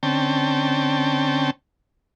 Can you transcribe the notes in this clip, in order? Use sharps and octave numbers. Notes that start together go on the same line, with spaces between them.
D3 C4 C#4 G5 A5